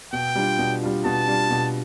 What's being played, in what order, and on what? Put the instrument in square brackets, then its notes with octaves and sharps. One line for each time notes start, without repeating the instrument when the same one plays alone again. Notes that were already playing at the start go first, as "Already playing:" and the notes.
[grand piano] B2 [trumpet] G5
[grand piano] G3 D4 F4
B2
G3 D4 F4
[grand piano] B2 [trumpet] A5
[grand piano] G3 D4 F4
B2